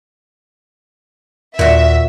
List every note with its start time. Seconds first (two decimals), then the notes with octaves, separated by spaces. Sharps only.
1.59 D#2 A#2 F#4 E5